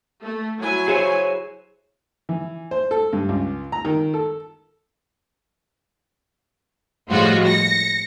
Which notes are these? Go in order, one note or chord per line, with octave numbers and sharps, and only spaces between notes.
A3
F#3 E4 G#5
G#4 C5 C#5
E3
C5
A4
G2
C#2
A#5
D#3
A4
A2 F3 G3 G#3 F4 F#4
A#6 C#7